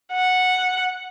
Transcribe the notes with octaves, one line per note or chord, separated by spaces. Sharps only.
F#5